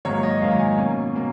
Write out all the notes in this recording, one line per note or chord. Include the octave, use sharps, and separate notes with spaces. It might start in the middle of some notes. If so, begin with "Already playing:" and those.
G#2 D#3 F#3 A#3 C#5
D#5
G#2 D#3 F#3 A#3 F5
A#5
G#5
B2 A#3 C#4
B2 A#3